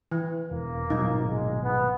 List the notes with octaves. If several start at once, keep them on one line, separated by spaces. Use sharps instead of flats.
E3
E1 A#3
G#1 B2 F#3 D#4
G#3
B3